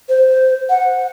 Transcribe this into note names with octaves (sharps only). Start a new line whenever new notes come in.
C5
F#5